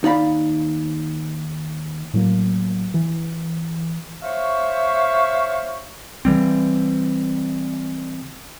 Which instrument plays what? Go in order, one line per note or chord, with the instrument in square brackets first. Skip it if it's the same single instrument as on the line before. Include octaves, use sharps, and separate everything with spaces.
[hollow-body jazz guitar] D#2 D#4 D5 F5 B5
[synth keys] A2 F#3 A#3
E3
[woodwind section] C5 C#5 E5 F5 C#6
[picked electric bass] C#3 E3 G3 C4